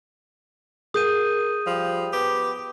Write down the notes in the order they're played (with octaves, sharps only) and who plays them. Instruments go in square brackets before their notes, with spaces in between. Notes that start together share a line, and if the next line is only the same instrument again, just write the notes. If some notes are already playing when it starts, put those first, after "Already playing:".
[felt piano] G#4 [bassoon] A#4 [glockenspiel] D#6 G6 D#7
[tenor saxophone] F3 [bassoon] G3
[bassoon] B3 [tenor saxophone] G4